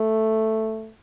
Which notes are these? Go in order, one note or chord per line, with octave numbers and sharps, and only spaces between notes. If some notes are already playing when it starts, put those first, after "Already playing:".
Already playing: A3